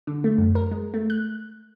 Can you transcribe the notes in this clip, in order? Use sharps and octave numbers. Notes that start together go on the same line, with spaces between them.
D3
A3
F#2
A#4
G#3
A3
F#6